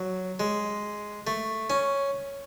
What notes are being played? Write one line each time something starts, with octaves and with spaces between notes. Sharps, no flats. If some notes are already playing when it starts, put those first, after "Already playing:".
Already playing: F#3
G#3
A3
C#4